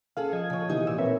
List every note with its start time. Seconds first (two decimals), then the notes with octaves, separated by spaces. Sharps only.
0.17 C#4 G#4 A4 F5
0.33 F3 D#5 G#6
0.50 C#3 C#5
0.69 B2 E3 D#4 G4
0.87 A#2 E6
0.99 C4 A#4 B4 C#5 E5